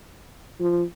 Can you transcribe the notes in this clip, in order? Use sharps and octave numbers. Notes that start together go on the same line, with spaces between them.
F3